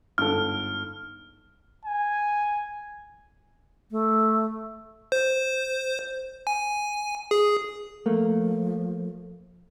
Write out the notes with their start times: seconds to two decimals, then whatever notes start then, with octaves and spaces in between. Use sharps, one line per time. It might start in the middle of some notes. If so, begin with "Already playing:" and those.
0.18 G1 G#2 A4 F6
1.85 G#5
3.91 A3
5.12 C5
6.47 G#5
7.31 G#4
8.06 F3 A3 A#3